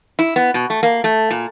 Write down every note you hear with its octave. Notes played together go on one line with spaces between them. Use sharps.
E4
B3
B2
A3
A#3
A3
A#2